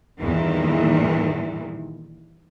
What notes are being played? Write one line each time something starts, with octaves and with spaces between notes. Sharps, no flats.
E2 G2 A#2 D#3 E3